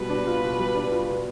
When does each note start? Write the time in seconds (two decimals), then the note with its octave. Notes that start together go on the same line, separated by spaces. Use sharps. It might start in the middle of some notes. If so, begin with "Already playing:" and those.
Already playing: B2 G3 B4
0.10 D4
0.26 F4
0.42 B2
0.59 G3
0.76 D4
0.91 F4
1.09 B2